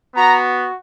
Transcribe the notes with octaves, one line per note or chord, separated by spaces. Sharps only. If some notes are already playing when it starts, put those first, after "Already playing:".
B3 F#4 A#5